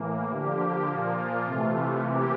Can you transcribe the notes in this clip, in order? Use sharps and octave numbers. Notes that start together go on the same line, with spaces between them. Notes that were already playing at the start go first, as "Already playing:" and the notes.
Already playing: A2 E3 A#3
D3 F3 A#3 G4
A#2 F3 A#3 F4
C3 E3 A3
C3 E3 A#3 G4